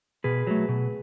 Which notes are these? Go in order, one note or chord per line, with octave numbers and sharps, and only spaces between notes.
B2 G#4 B4
F#3 A3
B2